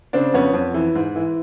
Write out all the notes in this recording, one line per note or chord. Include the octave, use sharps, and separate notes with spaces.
C#3 C4 D4
F2 B3 C#4
F2
E3
G#2
E3